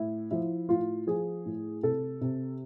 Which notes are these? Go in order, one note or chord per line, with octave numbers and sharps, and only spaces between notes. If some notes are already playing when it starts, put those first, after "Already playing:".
Already playing: A2 E4
F3 E4
A2 F4
F3 G#4
A2
C3 A4
C3